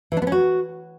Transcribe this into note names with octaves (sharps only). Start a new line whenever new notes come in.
E3
D4
B3
C#4
F#4